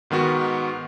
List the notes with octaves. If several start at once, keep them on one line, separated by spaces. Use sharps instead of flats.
G#2 D#3 B3 F#4